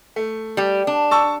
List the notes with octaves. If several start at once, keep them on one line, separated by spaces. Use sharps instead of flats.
A3
G3 G4
D4
A5 C#6 E6